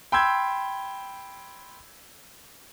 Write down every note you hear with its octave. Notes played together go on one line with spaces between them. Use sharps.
G5 B5 C6 E6 G6 G#6